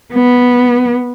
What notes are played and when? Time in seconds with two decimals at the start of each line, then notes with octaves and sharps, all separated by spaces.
0.13 B3